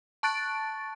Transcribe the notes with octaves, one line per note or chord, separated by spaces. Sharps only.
A5 C#6 F#6 A6 D7